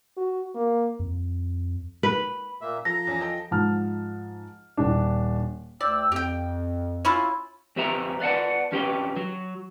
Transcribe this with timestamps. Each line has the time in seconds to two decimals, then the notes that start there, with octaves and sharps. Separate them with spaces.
0.17 F#4
0.55 A#3
0.99 F2
2.03 B4
2.61 A#2 A#3 E5
2.85 F3 A4 A#5 A#6
3.07 E2 C#4
3.21 A4 D#5 G5
3.51 G#2 F3 A5 F6
4.77 D#1 D4
5.81 D2 D5 G5 E6
6.12 F2 G4 G5
7.05 C#4 E4 F4
7.76 F2 C4 G4 B4 E5 A#5
8.20 B4 D5 F5 F#5 A5
8.72 F2 C#4 G4 B4 G5
9.16 F#3